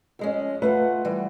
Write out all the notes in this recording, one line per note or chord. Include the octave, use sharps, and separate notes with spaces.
F2 G#3 C#4
A3 F4 B4 F#5
E3 G3